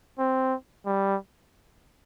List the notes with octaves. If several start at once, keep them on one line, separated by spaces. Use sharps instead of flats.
C4
G3